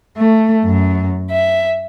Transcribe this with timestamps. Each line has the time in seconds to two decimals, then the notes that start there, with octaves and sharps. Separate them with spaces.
0.16 A3
0.64 F#2
1.30 E5